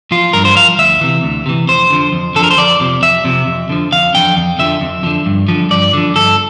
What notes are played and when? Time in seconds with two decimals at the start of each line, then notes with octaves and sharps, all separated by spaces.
0.11 F3 F4
0.33 G2 A#4
0.45 C5
0.56 F3 F5
0.79 D2 E5
1.01 C3 E3
1.23 D2
1.46 C3 E3
1.68 F2 C5
1.90 D3 F3
2.13 F2
2.35 D3 A4
2.39 F3 A#4
2.51 C5
2.58 F2 D5
2.80 C3 F3
3.02 F2 E5
3.25 C3 F3
3.47 F2
3.70 D3 F3
3.92 F2 F5
4.14 D3 F3 G5
4.37 F2
4.59 D3 F3 E5
4.81 F2
5.03 D3 F3
5.26 G2
5.48 D3 F3
5.70 G2 D5
5.94 D3 F3
6.16 G2 A4